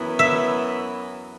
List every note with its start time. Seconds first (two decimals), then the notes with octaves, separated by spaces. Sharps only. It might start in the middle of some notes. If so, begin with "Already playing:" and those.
Already playing: F#2 E3 B3 E4
0.19 E5